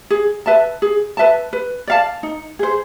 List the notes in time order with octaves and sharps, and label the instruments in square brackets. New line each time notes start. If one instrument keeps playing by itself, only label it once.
[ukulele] G#4
B4 E5 A5
G#4
B4 E5 A5
B4
D5 F5 A5
D#4
G#4 C5